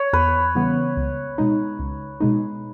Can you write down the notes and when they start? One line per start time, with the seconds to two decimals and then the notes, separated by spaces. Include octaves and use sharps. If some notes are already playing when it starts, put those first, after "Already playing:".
Already playing: C#5
0.13 E2 B4
0.55 C#3 E3 G3 B3
0.97 C#2
1.38 B2 G#3 D#4
1.79 C#2
2.21 B2 G#3 D#4